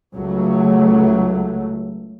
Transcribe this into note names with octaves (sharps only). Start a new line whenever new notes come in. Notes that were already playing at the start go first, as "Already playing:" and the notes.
C#2 F#3 A3